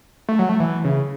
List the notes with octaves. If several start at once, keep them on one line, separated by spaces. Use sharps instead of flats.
A3
F#3
A3
E3
C#3